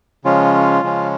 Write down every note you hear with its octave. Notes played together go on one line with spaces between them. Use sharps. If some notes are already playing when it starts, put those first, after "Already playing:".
C#3 F3 G#3 C#4 F4
C#3 F3 G#3 C#4